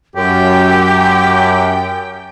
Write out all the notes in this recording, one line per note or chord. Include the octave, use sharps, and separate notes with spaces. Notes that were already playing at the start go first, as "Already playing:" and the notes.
F#2 G4 G5